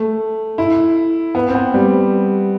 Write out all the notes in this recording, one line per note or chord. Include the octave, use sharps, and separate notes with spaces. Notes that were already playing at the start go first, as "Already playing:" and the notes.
Already playing: A3
E4
B3
C4
B3
G3